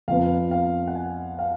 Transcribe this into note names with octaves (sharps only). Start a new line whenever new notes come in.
F2 F3 B3 F5
F5
F#5
G#5
F5